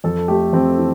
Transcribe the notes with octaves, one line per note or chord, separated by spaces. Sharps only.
F2 A4
A3 G4
F2 C4
E3